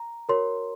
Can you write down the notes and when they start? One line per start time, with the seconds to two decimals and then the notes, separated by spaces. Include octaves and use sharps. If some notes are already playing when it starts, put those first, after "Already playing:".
Already playing: A#5
0.29 F#4 A#4 C#5 C6